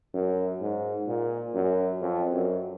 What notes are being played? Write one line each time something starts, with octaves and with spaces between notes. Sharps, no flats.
F#2
G#2
A#2
F#2
F2
F#2